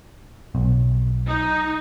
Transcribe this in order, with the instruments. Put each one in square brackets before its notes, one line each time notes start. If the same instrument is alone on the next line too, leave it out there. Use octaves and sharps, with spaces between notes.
[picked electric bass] B1
[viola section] D#4